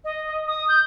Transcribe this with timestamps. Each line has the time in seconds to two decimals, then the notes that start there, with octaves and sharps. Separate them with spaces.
0.04 D#5
0.47 D#6
0.69 G6